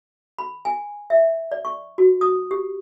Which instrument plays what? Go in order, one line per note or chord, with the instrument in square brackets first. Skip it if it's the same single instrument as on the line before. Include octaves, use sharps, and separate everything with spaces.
[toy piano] B5
G#5
E5
D5
C#6
F#4
D#6
G4